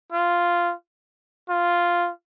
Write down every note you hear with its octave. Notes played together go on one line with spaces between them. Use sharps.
F4
F4